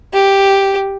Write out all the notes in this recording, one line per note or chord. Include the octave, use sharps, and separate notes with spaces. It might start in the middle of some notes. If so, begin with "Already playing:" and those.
G4